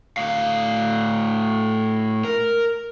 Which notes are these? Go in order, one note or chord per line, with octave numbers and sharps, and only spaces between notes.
A2 F5
A#4